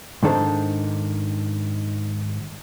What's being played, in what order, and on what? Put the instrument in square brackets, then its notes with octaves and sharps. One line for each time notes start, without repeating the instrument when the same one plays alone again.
[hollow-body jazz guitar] G#2 D#3 D4 A4 C5